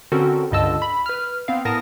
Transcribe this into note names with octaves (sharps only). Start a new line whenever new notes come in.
D3 C4 C#4 F#4 A4 A#4
C#2 G2 D3 D#5 A5 E6
B5
B4 F6
B3 C4 F5
A2 B3 A#4 A5 D#6 A#6